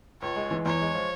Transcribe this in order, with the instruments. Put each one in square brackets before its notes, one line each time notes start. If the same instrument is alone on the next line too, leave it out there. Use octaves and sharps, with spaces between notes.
[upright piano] C#2 [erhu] C#5
[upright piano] G#3
E3
[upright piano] E2 [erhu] C#5
[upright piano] G#3
F3